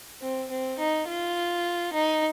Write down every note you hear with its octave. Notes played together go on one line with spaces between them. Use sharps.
C4
C4
D#4
F4
D#4